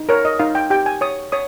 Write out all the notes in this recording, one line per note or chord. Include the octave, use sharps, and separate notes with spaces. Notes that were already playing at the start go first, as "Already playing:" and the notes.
Already playing: D#4
A#4 C#5
D#5
D#4 F5
G5
G4 G5
G#5
C#5 D#6
C#5 D#6